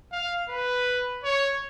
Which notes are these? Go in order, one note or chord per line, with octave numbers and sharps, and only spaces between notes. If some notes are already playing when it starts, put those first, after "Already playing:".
F5
B4
C#5